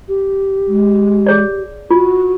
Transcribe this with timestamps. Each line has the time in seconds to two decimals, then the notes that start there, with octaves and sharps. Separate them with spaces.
0.08 G4
0.68 G#3
1.27 G#4 C#5 D5
1.91 F4 F#4